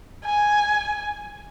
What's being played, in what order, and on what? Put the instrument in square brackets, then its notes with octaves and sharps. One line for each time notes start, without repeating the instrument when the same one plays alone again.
[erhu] G#5